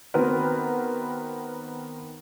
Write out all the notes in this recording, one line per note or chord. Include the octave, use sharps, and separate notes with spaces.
D#3 B3 C4 F#4 A#4 B4